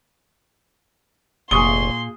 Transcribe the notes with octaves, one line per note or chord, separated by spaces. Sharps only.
F1 A#2 G#4 C6 C#6 D#6 G7